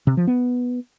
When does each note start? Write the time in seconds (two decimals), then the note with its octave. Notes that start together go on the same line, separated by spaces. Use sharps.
0.07 C3
0.17 F3
0.27 B3